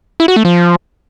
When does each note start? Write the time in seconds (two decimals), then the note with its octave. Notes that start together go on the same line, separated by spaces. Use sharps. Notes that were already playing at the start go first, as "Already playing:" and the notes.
0.20 E4
0.28 F#4
0.36 A3
0.45 F3